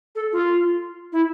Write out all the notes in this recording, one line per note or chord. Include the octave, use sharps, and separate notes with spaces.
A4
F4
E4